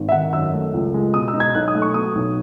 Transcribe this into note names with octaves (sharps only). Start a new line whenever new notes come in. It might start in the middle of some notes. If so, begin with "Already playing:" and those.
Already playing: G#1
E5
D#3 F#5
F#2 E6
A3
C#2
G#3
B2 D#6
E6
D#4
G#6
B1 F#6
D#6
A3
C#6
B2 D#6
B1